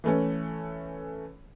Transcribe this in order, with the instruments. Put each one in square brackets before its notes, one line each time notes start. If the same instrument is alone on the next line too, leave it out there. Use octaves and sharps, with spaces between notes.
[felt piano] E3 A3 C#4